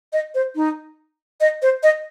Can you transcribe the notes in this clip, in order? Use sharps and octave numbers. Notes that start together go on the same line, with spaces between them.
D#5
C5
D#4
D#5
C5
D#5